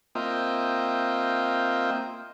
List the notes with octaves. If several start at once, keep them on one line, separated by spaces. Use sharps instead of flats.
A#3 C4 F4 D#5 E5 G5